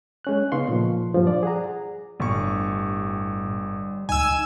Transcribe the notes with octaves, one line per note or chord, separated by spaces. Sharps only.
G#3 C#4 F#6
C#3 B3 D#4 F5 C6 C#6
A#2 F3
G2 F3
D5
G#4 F#5 A#5
G1 A2 G3 C#6
C#2 D#4 G#5 E6